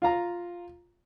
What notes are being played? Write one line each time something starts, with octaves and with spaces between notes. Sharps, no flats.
F4 F5 A#5